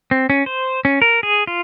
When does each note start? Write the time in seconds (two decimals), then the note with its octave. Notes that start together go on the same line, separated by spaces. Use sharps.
0.11 C4
0.30 C#4
0.46 C5
0.85 C#4
1.02 A#4
1.23 G#4
1.47 F4